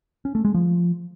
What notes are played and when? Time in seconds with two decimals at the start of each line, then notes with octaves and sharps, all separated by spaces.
0.25 C#4
0.35 A3
0.45 G#3
0.54 F3